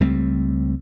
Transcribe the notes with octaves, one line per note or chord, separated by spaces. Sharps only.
C#2 G3 A3 C4